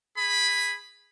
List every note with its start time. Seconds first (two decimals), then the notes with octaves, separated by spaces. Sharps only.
0.18 G#4 B5